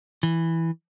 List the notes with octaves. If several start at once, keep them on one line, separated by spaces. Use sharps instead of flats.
E3